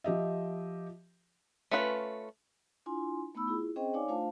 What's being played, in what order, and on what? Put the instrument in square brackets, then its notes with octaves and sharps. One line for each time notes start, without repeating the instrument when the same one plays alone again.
[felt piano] F3 G4 D#5 E5
[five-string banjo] A3 C#4 F4 B4
[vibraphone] D4 E4 F4 G#5 C6
A3 B3 D#4 B5 E6
E4 F4 G#4
C4 C#4 G#4 C5 D#5 G5
D#4 C#5 D5 F5 G#5 D6
A3 D4 F4 C5 F5 A5